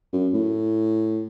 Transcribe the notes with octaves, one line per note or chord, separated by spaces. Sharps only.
F#2
A2